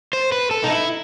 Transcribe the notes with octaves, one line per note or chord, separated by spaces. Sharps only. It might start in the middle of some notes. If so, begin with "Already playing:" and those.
C5
B4
A4
D#4
E4